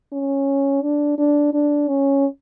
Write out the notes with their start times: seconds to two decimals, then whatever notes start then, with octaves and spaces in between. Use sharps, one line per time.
0.12 C#4
0.82 D4
1.18 D4
1.54 D4
1.89 C#4